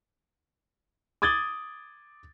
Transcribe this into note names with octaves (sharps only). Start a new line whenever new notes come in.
D6 D#6 G#6 A6 F#7 G7